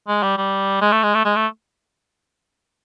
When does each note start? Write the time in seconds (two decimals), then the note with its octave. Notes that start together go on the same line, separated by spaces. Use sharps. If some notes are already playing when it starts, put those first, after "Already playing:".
0.08 G#3
0.23 G3
0.38 G3
0.81 G#3
0.92 A3
1.03 G#3
1.14 A3
1.25 G#3
1.36 A3